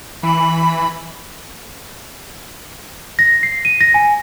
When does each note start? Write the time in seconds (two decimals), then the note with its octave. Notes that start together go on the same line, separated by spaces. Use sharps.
0.23 E3 B5
3.19 A#6
3.43 C7
3.65 D#7
3.81 A#6
3.94 G#5